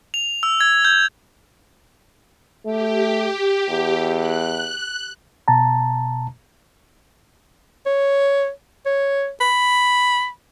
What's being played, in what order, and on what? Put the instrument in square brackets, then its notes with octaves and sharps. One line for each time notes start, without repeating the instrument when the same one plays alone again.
[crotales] F7
E6
G#6
G6
[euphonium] A3 [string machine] G4
[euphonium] E2
[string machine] F#6
[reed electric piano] B2 A5 A#5
[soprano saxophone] C#5
C#5
B5